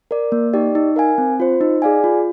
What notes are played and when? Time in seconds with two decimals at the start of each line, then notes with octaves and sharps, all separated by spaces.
0.11 A#4 D5
0.32 A#3
0.54 D#4 G4 D5
0.75 D#4
0.96 A#4 F5 G#5
1.18 C4
1.40 F4 C5
1.61 D#4
1.82 G#4 D5 F5 G#5
2.04 F4